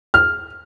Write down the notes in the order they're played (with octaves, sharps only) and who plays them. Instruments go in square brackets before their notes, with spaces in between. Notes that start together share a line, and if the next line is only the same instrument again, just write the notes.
[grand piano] F6